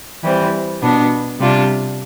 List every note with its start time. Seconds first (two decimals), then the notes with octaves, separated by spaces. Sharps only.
0.24 E3 G3 C4
0.82 B2 B3 D4
1.40 C3 G3 D4 F4